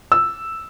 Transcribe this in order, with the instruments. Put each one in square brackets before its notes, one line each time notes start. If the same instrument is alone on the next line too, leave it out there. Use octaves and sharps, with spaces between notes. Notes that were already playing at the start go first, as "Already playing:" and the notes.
[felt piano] E6